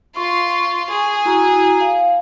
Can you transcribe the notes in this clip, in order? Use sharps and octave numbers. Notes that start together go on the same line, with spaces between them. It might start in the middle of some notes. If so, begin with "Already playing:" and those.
F4 C6 C#6
G#4
E4 F#4 A#5
F5